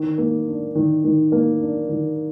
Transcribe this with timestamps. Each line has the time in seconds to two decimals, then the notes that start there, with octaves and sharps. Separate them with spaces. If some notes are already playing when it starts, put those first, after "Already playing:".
Already playing: D#3
0.18 A#3
0.47 D4
0.75 D#3
1.04 D#3
1.32 A#3
1.61 D4
1.89 D#3